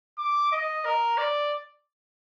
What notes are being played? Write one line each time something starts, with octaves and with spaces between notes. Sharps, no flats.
D6
D#5
A#4
D5